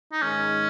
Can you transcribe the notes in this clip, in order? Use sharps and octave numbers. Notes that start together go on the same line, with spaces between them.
D#4
G#2 D#3 G#3 C#4